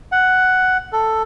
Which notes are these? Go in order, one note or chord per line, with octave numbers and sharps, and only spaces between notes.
F#5
A4